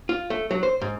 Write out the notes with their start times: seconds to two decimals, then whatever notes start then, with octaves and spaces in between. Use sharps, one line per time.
0.09 F4
0.30 A3
0.51 F#3
0.63 C5
0.81 G#2